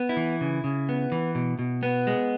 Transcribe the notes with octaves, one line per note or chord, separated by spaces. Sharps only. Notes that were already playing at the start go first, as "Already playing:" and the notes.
Already playing: B3
E4
E3
C#3
C#3
B3
E3
B2
B2
B3
G#3